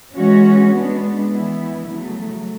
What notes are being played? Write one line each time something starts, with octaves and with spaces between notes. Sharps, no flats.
E3 G#3 C#4 F#4 C#5
G#3 B3 D4
E3 B3 E4
C#3 F#3 A3